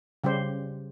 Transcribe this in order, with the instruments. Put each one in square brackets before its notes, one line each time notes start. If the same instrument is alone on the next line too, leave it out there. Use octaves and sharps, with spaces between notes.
[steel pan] C#3 G3 G4 C5